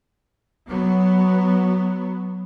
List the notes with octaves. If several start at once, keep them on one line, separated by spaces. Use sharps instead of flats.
F#3 B3